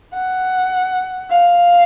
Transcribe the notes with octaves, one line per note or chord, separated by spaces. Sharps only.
F#5
F5